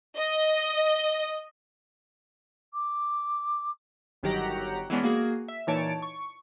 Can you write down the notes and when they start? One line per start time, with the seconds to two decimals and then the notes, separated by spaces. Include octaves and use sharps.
0.18 D#5
2.74 D6
4.23 G1 D#3 F#3 G4 F#5 A#5
4.90 E3 G#3 B3 C#4 D4
5.03 A#3 F#4 G#4
5.48 E5
5.67 A#2 E3 D#4 C#5 A5 D7
6.02 C#6